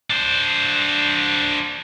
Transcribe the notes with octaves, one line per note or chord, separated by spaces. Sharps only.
D4 C5